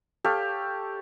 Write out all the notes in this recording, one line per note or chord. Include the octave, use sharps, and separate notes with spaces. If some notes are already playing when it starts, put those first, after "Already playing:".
G4 A4 C#5 F5